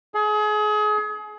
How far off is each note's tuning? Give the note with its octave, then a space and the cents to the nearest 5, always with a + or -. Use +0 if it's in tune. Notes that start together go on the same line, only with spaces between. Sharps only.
G#4 +30